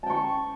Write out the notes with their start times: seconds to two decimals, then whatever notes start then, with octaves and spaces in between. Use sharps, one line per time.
0.03 A5
0.06 G5
0.10 C#6